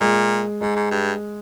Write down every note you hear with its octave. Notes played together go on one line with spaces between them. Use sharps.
A#2 G#3
G#2 G#3
G#2
G2